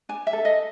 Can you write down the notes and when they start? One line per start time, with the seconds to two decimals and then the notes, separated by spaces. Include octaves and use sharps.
0.09 D4 G#5
0.27 E5
0.33 A4
0.45 D#5